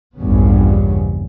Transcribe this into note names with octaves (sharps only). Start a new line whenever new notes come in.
A#1 E2 G2 C#3 B3